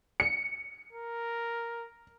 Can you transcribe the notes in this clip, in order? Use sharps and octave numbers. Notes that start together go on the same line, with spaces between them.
C#7
A#4